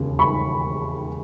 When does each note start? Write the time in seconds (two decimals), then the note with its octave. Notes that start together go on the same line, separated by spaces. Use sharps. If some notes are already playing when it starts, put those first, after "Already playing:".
Already playing: E1 D#2 C#3
0.19 B5 C#6